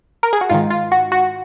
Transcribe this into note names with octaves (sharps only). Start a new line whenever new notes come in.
A#4
G#4
F#4
G#2 D#3 F4
F4
F#4
F#4